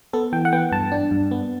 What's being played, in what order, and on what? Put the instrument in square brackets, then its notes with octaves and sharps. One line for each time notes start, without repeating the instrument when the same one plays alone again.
[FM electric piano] B3 A4
E3 G5
F#5
B3 G5
G2 A5
D4
G2
B3